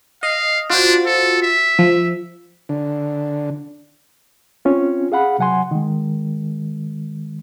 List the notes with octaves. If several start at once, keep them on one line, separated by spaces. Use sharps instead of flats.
D#5 F5
D4 F4 F#4 C5
A4
E5
F3
D3
C4 C#4 F4
G#4 F5 F#5 B5
C3 F#3 F#5 G#5 C6
D#3 G#3